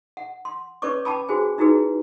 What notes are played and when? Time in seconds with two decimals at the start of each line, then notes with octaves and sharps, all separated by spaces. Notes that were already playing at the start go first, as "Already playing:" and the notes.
0.17 F#5
0.45 C6
0.82 C#4 B4 C#5 D5 C#6 D6
1.05 G5 A5 B5 D6
1.29 F#4 G#4 C5 G#5
1.58 D#4 E4 F#4 G#4 B4